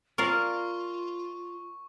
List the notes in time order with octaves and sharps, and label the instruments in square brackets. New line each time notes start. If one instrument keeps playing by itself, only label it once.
[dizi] F4 [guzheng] A#4 D5 F5 [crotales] C#6